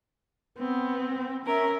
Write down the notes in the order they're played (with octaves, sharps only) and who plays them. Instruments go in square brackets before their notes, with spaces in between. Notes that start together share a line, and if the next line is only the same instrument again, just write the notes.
[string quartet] B3 [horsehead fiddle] C4
[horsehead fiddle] C#4 E5 [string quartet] A#4